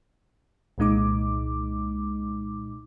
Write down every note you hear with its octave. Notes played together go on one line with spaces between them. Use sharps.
C2 A#2 G#3 D#4 D6